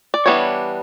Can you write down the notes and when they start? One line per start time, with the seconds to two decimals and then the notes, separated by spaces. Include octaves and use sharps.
0.14 D5
0.26 E3 G3 B3 D4 C#5